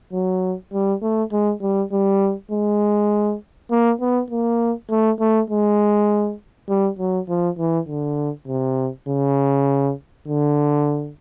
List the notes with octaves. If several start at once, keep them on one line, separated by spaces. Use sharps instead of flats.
F#3
G3
A3
G#3
G3
G3
G#3
A#3
B3
A#3
A3
A3
G#3
G3
F#3
F3
E3
D3
C3
C#3
D3